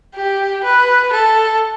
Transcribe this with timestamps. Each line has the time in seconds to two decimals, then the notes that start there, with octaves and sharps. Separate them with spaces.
0.15 G4
0.64 B4
1.13 A4